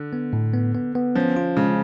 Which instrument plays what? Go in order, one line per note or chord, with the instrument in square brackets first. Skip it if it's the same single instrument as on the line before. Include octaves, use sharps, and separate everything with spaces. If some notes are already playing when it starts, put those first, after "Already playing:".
Already playing: [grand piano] D3
[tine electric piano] B3
A2
B3
B3
B3
[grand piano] F3 [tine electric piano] C#4
[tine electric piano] F4
[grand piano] C#3 [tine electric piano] G#3